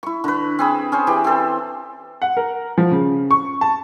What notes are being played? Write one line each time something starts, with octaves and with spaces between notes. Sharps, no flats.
E4 C#6
D3 B4
C4 G#4 B5
C#4 G#4 C5
E3 G4
C4 G#4 A4 C5
F#5
A#4
F3
C#3
C#6
A5